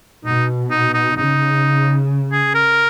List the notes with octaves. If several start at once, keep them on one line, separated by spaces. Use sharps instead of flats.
B2 D#4
D#4
D#4
C#3 D#4
G#4
A#4